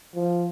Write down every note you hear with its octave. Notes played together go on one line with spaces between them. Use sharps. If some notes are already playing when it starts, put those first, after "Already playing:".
F3